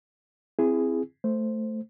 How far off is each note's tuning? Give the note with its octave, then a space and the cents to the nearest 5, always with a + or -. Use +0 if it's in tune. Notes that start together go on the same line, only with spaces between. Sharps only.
C4 +0 E4 +30 G#4 +0
A3 +0 C5 +0